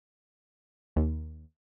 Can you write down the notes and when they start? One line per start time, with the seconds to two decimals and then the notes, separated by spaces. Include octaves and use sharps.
0.96 D#2